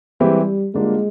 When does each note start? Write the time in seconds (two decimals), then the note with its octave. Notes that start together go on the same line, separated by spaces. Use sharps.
0.20 E3 G3 G#3 C4 E4 G4
0.74 D3 G3 G#3 A#3 D4 F4